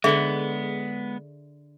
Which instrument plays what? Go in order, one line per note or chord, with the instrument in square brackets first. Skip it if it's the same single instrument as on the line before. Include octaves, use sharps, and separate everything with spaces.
[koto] D3 C#5 [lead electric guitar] G#3 B3 [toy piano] G#4 E5